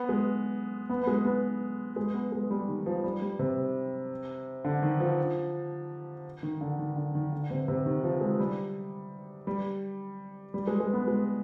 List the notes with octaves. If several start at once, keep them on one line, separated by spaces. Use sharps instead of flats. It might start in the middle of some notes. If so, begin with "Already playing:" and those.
Already playing: B3
G#3
B3
B3
G#3
B3
G#3
B3
G#3
G3
D#3
F3
G3
G3
C3
D3
D#3
F3
D#3
D3
D#3
D3
D#3
D3
C3
C3
D#3
F3
G#3
G3
G3
G3
G#3
G#3
B3
G#3